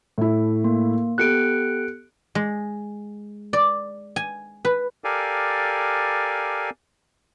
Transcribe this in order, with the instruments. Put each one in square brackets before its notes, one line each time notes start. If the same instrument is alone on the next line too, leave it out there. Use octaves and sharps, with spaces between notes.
[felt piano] A2 E4
[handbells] A#3
[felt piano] B3 G4 A4 [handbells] F#6 C#7 D7
[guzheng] G#3
D5
G#5
B4
[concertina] G4 A4 A#4 D5 F5 G#5